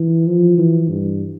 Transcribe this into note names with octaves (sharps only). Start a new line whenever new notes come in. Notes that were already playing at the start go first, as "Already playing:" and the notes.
Already playing: E3
F3
E3
G2